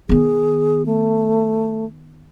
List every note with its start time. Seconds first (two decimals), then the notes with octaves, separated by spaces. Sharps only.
0.09 D#3 B3 G#4
0.86 A3